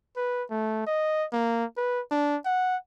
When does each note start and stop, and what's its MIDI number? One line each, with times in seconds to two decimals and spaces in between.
0.17 0.44 71
0.50 0.84 57
0.87 1.26 75
1.33 1.65 58
1.77 2.01 71
2.11 2.37 62
2.45 2.77 78